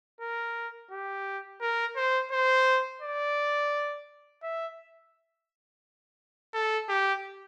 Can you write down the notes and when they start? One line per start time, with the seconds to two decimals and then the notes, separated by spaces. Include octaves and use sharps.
0.21 A#4
0.91 G4
1.61 A#4
1.96 C5
2.32 C5
3.02 D5
4.43 E5
6.54 A4
6.89 G4